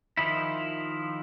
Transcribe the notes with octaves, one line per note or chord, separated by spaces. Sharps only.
D#3 F3 E4